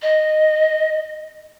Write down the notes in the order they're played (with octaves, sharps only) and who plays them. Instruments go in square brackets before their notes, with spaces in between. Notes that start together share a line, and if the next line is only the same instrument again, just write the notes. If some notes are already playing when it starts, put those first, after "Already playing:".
[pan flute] D#5